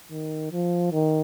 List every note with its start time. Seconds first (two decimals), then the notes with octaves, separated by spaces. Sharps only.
0.11 D#3
0.52 F3
0.92 D#3